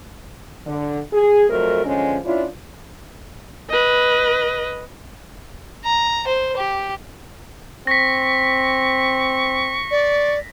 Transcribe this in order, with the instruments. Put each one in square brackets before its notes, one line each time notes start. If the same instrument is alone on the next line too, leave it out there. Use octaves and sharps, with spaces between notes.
[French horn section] D3
G#4
F2 F#3 A3 A4 A#4
D3 F3 G#3 C#4
C#4 D4 E4 F4
[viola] B4 D#5
[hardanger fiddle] A#5
C5
G4
[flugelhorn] C4 [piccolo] C#6 [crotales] A#6 B6
[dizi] D5